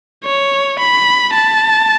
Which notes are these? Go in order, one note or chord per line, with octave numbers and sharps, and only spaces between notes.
C#5
B5
A5